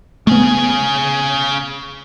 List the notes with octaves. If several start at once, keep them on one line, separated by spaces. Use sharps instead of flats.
C#3 A3 B3 G#4